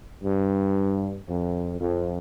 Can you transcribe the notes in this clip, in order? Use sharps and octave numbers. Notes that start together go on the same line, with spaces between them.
G2
F2
F2